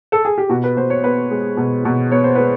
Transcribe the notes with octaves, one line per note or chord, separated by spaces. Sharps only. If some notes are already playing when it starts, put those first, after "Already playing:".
A4
G#4
G4
B2 F#4
B4
B2 C5
C#5
B3 B4
G#3
B2
B2
B3 C#5
C5
G#3 B4